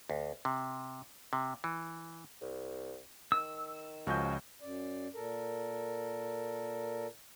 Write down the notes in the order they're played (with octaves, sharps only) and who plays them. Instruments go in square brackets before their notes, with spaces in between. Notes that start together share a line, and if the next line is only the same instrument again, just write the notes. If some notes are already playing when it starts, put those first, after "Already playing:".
[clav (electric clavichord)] D2
C3
C3
E3
[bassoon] C2
[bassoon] D#3 [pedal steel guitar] E6
[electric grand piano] C#2 D#5 G6 [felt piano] F3 C#4 F#4
[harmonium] F#2 D5
A#2 A4 A#4